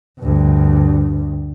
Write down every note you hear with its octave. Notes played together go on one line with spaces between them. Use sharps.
D2 G2